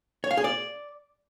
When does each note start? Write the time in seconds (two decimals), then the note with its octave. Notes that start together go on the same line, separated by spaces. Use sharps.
0.24 C#5
0.31 F5
0.37 G#4
0.44 D5